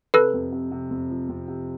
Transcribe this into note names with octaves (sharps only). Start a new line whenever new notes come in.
C3 A4 B4
F2
C3
C3
F2
F3
F2
C3